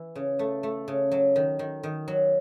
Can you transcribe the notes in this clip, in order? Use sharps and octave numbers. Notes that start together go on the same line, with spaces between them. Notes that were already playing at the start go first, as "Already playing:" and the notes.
Already playing: E3
C#3
A3
A3
C#3
F#3
D#3
D#3
D#3
F#3